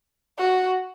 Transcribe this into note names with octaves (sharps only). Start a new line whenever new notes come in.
F#4